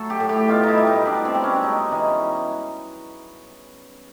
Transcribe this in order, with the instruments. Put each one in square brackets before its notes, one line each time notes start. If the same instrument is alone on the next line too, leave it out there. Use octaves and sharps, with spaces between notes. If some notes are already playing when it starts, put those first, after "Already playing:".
Already playing: [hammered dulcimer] F#3 A3 A4
G4
A2
G4
B2 F4
D#4 E4
G3
D#4
B2 D4
C4
G3
C#4
D4
G#3 D#4
E3 D#4